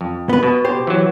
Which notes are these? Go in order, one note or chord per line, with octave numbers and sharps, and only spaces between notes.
F2
B3 B4
B2
G4 C5
E3 F#3